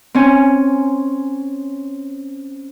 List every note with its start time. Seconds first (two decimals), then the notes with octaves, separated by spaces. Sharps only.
0.15 C4 C#4 G#5